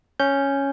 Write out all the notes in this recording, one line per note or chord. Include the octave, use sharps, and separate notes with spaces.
C#4 G6